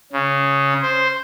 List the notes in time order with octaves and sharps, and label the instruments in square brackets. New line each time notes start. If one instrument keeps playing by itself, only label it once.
[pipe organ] C#3
C5